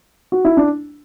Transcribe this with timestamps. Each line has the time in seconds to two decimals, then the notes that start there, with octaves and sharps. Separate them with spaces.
0.32 F#4
0.45 E4
0.57 D4